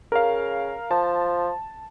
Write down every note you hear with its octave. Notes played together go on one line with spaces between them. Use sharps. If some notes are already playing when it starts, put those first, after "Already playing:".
C#3 A#4 F5
F3 A5